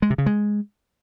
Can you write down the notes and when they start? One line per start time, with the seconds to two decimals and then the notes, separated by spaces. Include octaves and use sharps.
0.02 G#3
0.10 C3
0.18 C#3
0.26 G#3